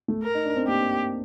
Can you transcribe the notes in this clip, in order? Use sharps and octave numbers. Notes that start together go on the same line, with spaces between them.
A3
A#4
D#4
D4
C4
A#3 G4
C4